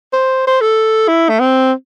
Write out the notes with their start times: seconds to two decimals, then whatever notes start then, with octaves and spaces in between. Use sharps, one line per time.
0.13 C5
0.47 C5
0.61 A4
1.08 E4
1.29 A3
1.40 C4